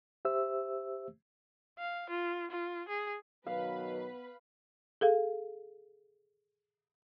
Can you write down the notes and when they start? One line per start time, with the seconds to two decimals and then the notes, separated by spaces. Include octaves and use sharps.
0.25 G4 C5 E5 E6
1.79 F5
2.10 F4
2.50 F4
2.88 G#4
3.47 B2 D#3 F#3 B3 B4 F5 B5
5.01 G#4 A4 F5